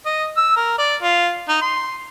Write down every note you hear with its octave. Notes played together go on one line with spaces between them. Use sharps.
D#5
E6
A#4
D5
F4
D#4
C6